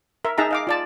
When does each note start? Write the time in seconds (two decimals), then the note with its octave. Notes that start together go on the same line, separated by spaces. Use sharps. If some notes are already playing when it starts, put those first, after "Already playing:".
0.25 A#4 E5
0.38 D#4 G#4 E5 A5 A#5
0.51 D#5 F5 D6
0.67 F4 D5 A5